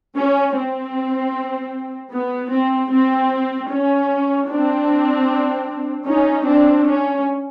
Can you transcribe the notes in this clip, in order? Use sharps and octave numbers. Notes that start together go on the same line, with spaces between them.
C#4
C4
B3
C4
C4
C#4
C4 D4
C#4 D#4
C4 D4
C#4